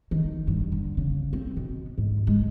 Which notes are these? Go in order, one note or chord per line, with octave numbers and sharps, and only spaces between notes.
D#3
G2
D3
C#3
C4
B2
G#2
G#3